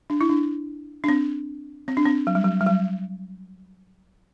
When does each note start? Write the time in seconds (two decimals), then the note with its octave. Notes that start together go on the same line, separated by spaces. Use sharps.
0.10 D4
0.21 E4
0.29 D4
1.04 D4
1.09 C4
1.88 C4
1.97 D4
2.06 C4
2.27 F#3
2.35 G3
2.44 F#3
2.61 G3
2.67 F#3